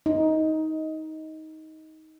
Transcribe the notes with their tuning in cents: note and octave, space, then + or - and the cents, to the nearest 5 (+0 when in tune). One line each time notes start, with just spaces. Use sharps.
D#4 +15